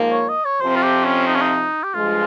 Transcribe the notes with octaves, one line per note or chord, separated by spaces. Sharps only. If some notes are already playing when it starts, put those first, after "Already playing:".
Already playing: G#2 F3 A#3
C#5
D#5
C#5
F2 C3 F3 C4 C5
F4
G4
C#4
D#4
C#4
D#4
G4
G2 F3 G#3 F4